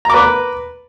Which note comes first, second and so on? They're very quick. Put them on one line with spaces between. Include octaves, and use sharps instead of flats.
A#5 D6 B4